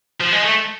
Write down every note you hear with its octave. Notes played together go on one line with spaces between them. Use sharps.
F3
G#3
A3